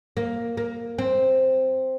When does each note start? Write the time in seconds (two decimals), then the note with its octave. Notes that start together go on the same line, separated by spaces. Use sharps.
0.17 A#3
0.57 A#3
0.98 C4